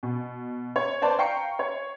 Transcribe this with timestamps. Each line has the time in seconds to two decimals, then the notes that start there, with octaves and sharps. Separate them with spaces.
0.03 B2
0.76 C#5
1.02 B4 C5 D5 A5
1.19 F5 G5 A#5 C#6 C7 C#7
1.59 C#5